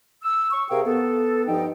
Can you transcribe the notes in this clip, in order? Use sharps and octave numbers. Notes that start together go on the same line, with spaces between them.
E6
C#6
C3 G#4 A#4 F5 G5
B3 A4
G2 F3 D#4 G5